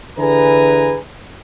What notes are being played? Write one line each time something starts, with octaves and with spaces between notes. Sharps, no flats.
D3 E3 G#4 B4 G#5 A#5